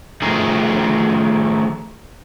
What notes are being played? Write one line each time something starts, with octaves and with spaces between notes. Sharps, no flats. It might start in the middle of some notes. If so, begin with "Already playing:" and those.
D#3 F3 A3 D#4 G#4